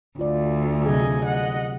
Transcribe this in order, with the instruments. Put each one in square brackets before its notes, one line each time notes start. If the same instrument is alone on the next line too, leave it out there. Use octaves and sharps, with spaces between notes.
[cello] D2 [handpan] F4 D5
[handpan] C3 F#3 G#4 [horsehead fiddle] D#5 G#5
[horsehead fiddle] D#5 F#5